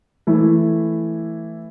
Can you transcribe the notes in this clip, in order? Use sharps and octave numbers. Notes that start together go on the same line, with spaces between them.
E3 A3 E4